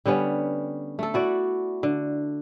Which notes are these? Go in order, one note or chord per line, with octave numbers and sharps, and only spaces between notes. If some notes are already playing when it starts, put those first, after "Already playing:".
D3 G3 B3 C#4
A3 A4
E4 F#4 D5
D3